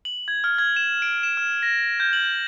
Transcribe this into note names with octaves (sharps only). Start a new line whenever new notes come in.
F#7
G#6
F6
G#6
E7
D7
E7
F6
A#6
G6
F#7